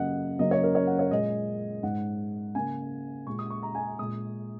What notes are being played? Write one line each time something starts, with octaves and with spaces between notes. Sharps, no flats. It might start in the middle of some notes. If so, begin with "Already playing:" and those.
Already playing: F#2 C#3 F#3 A#3 D#5 F#5
F#2 C#3 F#3 A#3 D#5
C#5
A#4
C#5
F#5
C#5
A#2 G#3 D#5
G#2 G#3 F#5
C#3 A#3 G#5
A#2 G#3 C#6
D#6
C#6
A#5
G#5
A#2 G#3 D#6